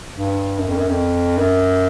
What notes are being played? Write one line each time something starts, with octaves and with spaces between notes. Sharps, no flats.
G2
F#2
F2
F#2
F2
F#2